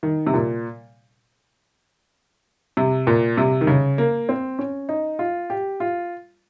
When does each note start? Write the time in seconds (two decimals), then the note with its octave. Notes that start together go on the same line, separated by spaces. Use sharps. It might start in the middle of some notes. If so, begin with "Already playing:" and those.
0.03 D#3
0.27 C3
0.34 A#2
2.77 C3
3.07 A#2
3.37 C3
3.61 D#3
3.67 C#3
3.98 A#3
4.29 C4
4.59 C#4
4.89 D#4
5.19 F4
5.50 G4
5.80 F4